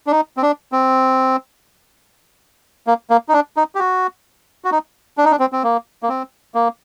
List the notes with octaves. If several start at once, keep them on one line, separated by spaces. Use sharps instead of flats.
D4
D#4
C4
D4
C4
A#3
A#3
D#4
D4
D#4
G4
F#4
F#4
D#4
D4
D#4
D4
C4
C4
A#3
A#3
C4
A#3